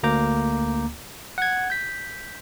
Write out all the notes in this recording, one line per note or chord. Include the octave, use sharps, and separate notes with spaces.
D2 A#3 A#5 D6 G6
F#5 G#6
G6 B6